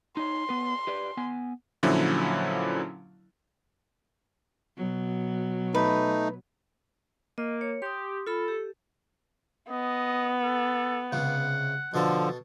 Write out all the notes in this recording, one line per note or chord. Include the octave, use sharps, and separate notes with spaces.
D#4 C#5 C6
B3 B4
G4 B4 D5
B3 G#5
A#2 D3 F3 F#3 C#4 E4
B2 F#3
A3 D#4 B4
A#3 D#5
C#5
G4 C6 D#6
F4 A4 B5
G4
B3 D#5
A4
C#2 C3 F#5
B2 D3 F3 A4